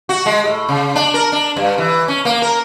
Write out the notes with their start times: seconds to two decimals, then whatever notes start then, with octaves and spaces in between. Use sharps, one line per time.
0.09 F#4
0.26 G#3
0.45 A2
0.69 C#3
0.96 D4
1.14 A#4
1.32 D4
1.56 G2
1.78 E3
2.08 C#4
2.25 A#3
2.42 A#4